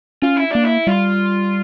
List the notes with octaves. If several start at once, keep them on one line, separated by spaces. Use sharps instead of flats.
C#4 F4
E4
A#3 D4
E4
G3 F4